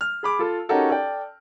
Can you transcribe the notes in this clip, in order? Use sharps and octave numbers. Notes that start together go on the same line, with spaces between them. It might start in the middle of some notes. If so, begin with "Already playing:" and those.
F6
G#4 B5 D6
F4 A4
C#4 D#4 F#4 G4 A4 A#4
A4 D5 G5